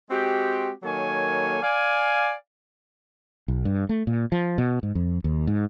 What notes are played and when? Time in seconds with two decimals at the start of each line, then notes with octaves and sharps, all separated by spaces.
0.11 G#3 C4 F#4 G4
0.83 D#3 F#3 A#3 A4 C#5 G#5
1.62 D5 F5 G#5
3.48 B1
3.65 G2
3.89 A3
4.07 A#2
4.32 F3
4.58 B2
4.83 G#2
4.95 F2
5.24 D#2
5.47 G#2